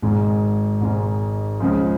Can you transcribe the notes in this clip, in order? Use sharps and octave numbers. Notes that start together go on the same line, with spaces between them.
G#1 G#2 G#3
G#1 G#2 G#3
C#2 C#3 F3